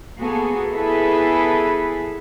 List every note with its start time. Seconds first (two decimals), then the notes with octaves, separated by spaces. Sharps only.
0.19 A#3 B3 F#4 G#4 A4
0.71 B3 E4 G#4 A4 B4